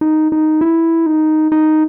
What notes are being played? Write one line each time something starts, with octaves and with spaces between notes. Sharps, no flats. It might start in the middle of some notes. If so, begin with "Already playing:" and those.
D#4
D#4
E4
D#4
D#4